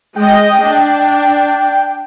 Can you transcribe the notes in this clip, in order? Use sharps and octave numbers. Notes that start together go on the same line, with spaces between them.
G#3 D#5 G5
D4